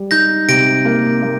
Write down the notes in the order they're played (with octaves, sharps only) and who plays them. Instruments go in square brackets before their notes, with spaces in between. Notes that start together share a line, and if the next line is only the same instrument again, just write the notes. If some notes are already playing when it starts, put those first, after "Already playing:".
Already playing: [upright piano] G3
[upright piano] D#4 [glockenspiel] G6 A#6
[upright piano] C3 [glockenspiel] A#6 D7
[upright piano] A#3
A#3